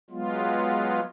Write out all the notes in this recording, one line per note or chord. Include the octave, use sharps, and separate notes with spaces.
F#3 G#3 B3 F4